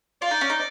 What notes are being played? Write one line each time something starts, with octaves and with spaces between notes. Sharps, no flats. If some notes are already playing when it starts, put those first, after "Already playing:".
F4 D5
D#4
C#4
D#4